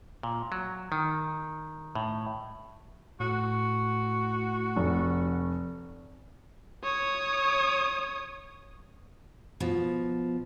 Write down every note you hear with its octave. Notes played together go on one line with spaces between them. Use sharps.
A#2
F#3
D#3
A2
A2 F#4
F1
C#5 D#6
B2 F3